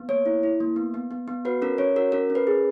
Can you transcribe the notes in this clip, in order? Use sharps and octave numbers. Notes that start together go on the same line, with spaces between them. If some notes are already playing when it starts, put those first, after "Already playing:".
Already playing: B3
A#3 C#5
E4
E4
A#3
B3
B3
B3
B3
F#4 B4
C#4 A#4
C#4 C#5
F#4 A#4
C#4 A#4
C#4
B4
G#4